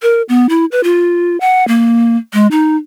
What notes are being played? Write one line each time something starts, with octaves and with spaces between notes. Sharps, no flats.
A#4
B3
E4
B4
F4
F#5
A#3
G#3
D#4